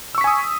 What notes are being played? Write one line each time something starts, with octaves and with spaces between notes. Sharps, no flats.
G#5 C#6 D#6 E6 B6